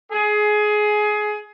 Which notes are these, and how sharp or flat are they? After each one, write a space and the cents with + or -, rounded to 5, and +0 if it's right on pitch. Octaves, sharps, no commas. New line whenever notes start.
G#4 +20